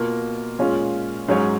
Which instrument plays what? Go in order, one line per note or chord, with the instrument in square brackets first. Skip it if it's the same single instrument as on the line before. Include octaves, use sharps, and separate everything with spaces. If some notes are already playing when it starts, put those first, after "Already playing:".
Already playing: [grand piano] B2 A#3 F4 A#4
A#2 G#3 C#4 F4
G#2 F#3 C#4 G#4 C#5